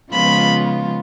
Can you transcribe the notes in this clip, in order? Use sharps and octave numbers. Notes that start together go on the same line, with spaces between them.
C#3 F3 G#3 B3 F4 B5